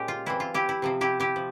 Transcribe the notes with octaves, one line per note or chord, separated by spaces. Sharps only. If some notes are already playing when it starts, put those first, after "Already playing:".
Already playing: A#2 G#3 C#4 G4
F4
E3 G3 C4 E4
F4
E4 G4
E4
C3 F3 C4
E4 G4
E4 G4
F3